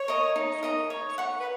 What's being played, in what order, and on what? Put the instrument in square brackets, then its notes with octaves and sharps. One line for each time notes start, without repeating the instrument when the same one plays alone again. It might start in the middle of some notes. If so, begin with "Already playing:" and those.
Already playing: [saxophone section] C#5
[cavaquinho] A#4 D#5 A#5
D#4
A#4 D#5 A#5
C#5
F#5 C#6
[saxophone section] B4